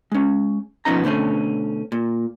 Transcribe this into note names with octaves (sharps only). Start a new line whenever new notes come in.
G#3 C#4
B2 F3 B3 C#4 D#4 A#5
B2 D3 A3 C4 C#4
A#2